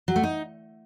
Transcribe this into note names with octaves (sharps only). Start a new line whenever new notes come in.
F#3
A3
D#4